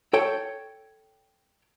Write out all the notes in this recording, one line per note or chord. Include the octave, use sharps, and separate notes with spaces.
A4 C#5 G5